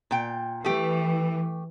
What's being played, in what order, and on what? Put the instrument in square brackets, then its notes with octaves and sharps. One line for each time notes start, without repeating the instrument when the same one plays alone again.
[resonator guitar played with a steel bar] A#2 G5
[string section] E3 [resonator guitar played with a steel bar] A3 G4